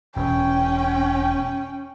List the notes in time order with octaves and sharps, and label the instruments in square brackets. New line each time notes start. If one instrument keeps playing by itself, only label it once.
[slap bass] E1 [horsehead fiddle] C#4 [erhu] G5